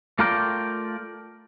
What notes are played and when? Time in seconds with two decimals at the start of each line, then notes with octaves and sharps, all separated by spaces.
0.19 A3 F4 A4 A#4 D5 G5